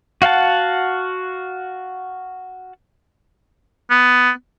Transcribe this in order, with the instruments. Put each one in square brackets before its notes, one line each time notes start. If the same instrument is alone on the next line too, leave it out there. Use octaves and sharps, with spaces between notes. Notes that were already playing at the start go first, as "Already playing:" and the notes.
[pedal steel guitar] F#4 F5 F#5 A5
[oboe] B3